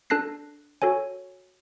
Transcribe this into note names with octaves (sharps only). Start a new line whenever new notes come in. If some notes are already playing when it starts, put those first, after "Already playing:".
D4 A4 A5 F#6 A#6 C7
F#4 A4 C#5 G#5